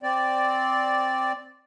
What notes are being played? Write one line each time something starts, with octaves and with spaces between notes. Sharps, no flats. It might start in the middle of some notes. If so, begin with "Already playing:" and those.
C4 D5